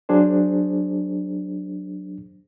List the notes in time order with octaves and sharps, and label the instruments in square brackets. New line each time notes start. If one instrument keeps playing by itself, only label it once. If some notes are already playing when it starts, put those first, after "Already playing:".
[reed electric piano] F#3 D4 G#4 C5